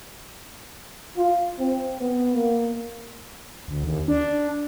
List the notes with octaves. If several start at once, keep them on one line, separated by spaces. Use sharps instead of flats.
F4
C4
B3
A#3
D2
D#2
D4